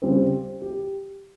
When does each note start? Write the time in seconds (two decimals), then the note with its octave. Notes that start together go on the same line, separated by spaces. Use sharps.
0.02 C#3 G3 C4
0.62 G4